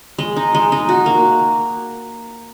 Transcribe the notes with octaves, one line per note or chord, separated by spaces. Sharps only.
G#3
D#4
G#3
D#4
F#4
A#3